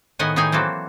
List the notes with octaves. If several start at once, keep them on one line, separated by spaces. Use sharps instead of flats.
A2 D#3 B3 D#5 F#5 G#5
A2 D#3 D#4 G#4 G5 G#5
E3 F#3 A#3 C4 A4